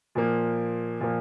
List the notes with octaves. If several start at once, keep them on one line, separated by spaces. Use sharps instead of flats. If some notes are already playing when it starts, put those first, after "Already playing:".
A#2 F3 A#3
A#2 F3 A#3